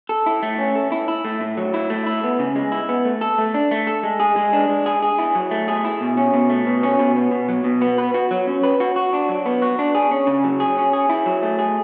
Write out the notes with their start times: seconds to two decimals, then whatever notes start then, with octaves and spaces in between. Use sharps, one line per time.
0.09 A4
0.26 E4
0.43 A3
0.58 C#4
0.75 A4
0.92 E4
1.08 E4
1.25 A3
1.41 A2
1.57 F#3
1.74 E4
1.90 A3
2.06 E4
2.24 B3
2.39 C#3
2.56 G#3
2.72 E4
2.89 B3
3.05 A3
3.21 A4
3.38 A3
3.54 D4
3.71 A3
3.87 A4
4.03 G#3
4.20 G#4
4.36 G#3
4.53 D4
4.69 G#3
4.86 G#4
5.02 G#4
5.18 E4
5.35 F#3
5.51 A3
5.68 G#4
5.85 E4
6.01 B2
6.17 C#4
6.34 B2
6.50 A3
6.66 B2
6.83 C#4
6.99 B2
7.16 B3
7.31 B2
7.49 F#3
7.64 B2
7.81 B3
7.98 B4
8.14 F#4
8.31 F#3
8.47 C#4
8.63 B4
8.80 F#4
8.96 F#4
9.13 D4
9.29 F#3
9.46 B3
9.62 F#4
9.79 D4
9.95 G#4
10.11 C#4
10.27 C#3
10.44 F#3
10.60 G#4
10.77 C#4
10.93 G#4
11.10 E4
11.26 F#3
11.43 A3
11.59 G#4